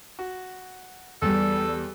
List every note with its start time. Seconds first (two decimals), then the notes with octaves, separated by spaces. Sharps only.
0.19 F#4
1.22 E2 G3 A4